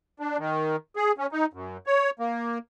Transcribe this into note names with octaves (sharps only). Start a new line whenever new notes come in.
D4
D#3
G#4
C#4
D#4
F#2
C#5
A#3